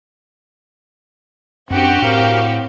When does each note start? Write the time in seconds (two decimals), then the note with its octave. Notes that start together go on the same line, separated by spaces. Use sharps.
1.70 F#2 C4 D4 F#4 G4 F#5
2.02 A2 A#4 F5